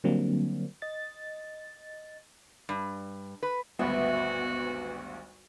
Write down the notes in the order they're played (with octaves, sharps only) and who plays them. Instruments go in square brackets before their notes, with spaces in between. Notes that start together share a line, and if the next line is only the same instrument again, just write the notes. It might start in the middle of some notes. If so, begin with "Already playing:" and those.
[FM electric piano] D3 F#3 G3 A#3 C4 D4
D#5 A6
[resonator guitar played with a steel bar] G2
B4
[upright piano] G#1 D2 G2 [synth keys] B3 [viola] F#4 [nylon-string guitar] E5